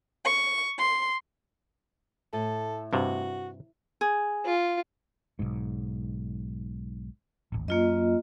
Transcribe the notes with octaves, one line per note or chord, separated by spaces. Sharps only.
C#6
C6
A2 A4
G2 C3 F#4
G#4
F4
B1 G#2
D1 G#1
F#2 A#3 F4 D#5